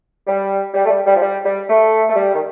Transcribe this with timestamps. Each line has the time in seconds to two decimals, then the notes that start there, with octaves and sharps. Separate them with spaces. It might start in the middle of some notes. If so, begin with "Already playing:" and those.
0.27 G3
0.74 G3
0.85 A3
0.89 G3
1.06 G3
1.16 F3
1.21 G3
1.45 G3
1.69 A3
2.09 A3
2.15 G3
2.34 D#3